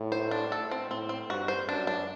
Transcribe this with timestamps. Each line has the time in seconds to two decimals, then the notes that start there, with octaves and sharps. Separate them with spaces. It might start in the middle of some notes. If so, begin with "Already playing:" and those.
Already playing: A2
0.12 C5
0.31 D4
0.52 A4
0.71 C4
0.90 A2 C4
1.09 C4
1.30 G2 F#4
1.48 C5
1.68 F#2 D4
1.87 D4